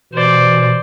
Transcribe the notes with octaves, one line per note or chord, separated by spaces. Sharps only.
B2 E3 C5 D5